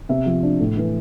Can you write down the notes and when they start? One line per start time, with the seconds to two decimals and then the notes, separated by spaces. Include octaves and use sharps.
0.09 C3 E5
0.26 F3
0.43 D4
0.60 A2
0.77 E3